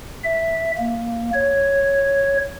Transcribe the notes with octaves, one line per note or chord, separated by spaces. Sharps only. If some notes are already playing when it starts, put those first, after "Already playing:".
E5
A#3
C#5